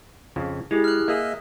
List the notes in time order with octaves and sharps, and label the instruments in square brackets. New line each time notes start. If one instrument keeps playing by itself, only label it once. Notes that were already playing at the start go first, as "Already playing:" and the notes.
[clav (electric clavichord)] F2 C#3 F3
[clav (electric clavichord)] G#3 [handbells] E4 G4 G#4
[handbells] F6 F#6
[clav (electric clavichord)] A#3 G#4 [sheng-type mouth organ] D#5 E5